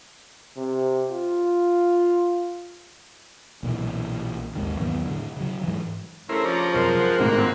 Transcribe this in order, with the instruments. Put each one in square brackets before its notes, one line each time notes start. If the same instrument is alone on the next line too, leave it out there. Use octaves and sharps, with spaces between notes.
[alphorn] C3
F4
[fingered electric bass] B1 A#2 D#3 E3
G#1 D#2 G#2 D#3
E2 D#3 F#3 B3
A2 D3
C#3 F#3
G#2 E3
[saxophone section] G2 C#3 C#4 [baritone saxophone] A3 [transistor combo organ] E4 A#4 C5
[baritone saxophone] F3 [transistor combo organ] C#5 D5 A#5
[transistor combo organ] F#2 C3 C5 [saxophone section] G#3 A#4
[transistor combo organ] C5 F#5
[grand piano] G#1 A2 [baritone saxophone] A#3
[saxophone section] F3 C4